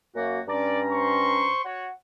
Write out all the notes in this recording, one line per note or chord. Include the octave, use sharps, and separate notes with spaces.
F#2 A#3 F#4
G2 C#4 D5 A#5
C5 C6 C#6
F#4 C#5 F#5